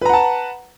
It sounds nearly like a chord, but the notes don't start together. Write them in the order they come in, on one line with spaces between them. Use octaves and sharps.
B4 A#5 F#5 A5